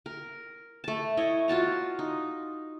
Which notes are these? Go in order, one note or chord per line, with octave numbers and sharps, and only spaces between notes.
A#4
A3 A5
E4 C#5 D#5
F4 F#4 A5 A#5
D#4